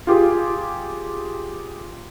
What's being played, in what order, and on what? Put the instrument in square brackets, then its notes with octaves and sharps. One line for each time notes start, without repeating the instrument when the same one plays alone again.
[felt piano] F4 G4 G#4